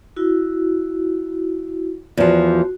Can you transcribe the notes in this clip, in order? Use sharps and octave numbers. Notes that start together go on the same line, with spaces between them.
E4 F#4
E2 F3 F#4